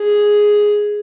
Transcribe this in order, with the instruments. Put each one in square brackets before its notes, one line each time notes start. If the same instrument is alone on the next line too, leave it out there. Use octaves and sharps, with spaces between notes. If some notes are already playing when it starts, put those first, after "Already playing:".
Already playing: [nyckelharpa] G#4